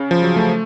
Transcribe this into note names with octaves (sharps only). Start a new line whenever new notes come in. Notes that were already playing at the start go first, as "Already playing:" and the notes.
Already playing: C#3
F3
F#3
A3